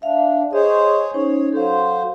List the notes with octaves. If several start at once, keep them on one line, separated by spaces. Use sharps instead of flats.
D4 E5 F5
G#4 C5 C#5 D#5
C#4 D#4 C5 C#5
F#3 A4 C5 F5